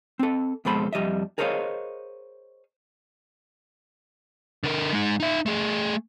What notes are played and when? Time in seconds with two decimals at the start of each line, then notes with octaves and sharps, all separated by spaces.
0.19 C4 A4
0.65 F2 B2 G#3 A4 C5 B5
0.93 F2 G3 D#5 E5
1.38 G#4 A#4 C5 C#5 D#5 F5
4.64 D3 A#4
4.92 G#3 D#4
5.20 D#4 E5
5.46 A3 G#4